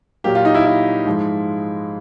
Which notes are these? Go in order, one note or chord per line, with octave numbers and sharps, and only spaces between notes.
A#2 F#3 A#3 G4
F4
D#4
E4
E4
G#2 F3 G#3